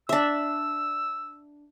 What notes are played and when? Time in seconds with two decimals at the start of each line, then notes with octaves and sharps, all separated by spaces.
0.09 D4 E5 E6